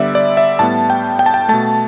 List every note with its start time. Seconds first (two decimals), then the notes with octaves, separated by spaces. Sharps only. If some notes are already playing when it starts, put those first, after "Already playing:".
Already playing: D3 G3 B3 D5 E5
0.15 D5
0.37 E5
0.59 A2 G3 B3 A5
0.90 G5
1.19 G5
1.26 A5
1.34 G5
1.49 B2 A3 A5